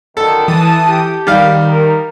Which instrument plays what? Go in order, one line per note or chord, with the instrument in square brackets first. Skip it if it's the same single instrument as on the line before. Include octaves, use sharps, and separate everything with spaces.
[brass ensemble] F#2 D3 D#3 [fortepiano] A4
[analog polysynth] E3 D#6 [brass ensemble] A5
[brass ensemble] G4
[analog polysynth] D#3 [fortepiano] G3 F5
[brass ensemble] A#4